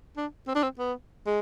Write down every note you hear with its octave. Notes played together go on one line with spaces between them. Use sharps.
D4
C4
D4
C4
B3
G#3